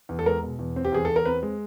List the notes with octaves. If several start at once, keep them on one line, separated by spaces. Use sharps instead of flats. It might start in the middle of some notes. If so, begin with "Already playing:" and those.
E2
A4
G#3 A#4
B2
E2
C4
G4
E2 G#4
E2 A4
A#4
C4 B4
G#3